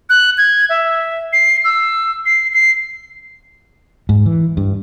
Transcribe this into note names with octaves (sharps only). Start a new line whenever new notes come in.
F#6
G#6
E5
C7
E6
C7
C7
G#2
E3
G2